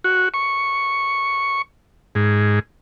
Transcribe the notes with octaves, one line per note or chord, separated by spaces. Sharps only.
F#4
C#6
G#2